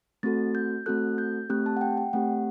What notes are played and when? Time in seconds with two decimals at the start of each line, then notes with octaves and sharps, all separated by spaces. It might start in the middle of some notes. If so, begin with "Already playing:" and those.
0.23 A3 C4 F#4 A4 A6
0.55 G6
0.86 A3 C4 F#4 A4 F#6
1.18 G6
1.50 A3 C4 G4 F#6
1.66 A5
1.77 F#5
1.81 G5
1.97 G5
2.13 A3 C4 G4 F#5